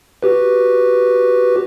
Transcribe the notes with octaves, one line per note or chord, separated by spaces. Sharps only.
F#4 G4 B4